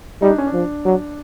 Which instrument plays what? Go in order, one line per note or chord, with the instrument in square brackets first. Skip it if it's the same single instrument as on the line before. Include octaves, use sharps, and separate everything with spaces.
[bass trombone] G3 [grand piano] D#4
[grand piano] D4
C#4
D4
[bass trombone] F3
F#3